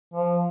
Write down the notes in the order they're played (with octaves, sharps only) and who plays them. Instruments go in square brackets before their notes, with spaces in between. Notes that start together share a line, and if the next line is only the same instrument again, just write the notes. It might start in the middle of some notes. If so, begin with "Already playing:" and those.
[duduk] F3